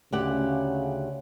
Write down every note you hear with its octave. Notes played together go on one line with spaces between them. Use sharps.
D2 C#3 G4 F#5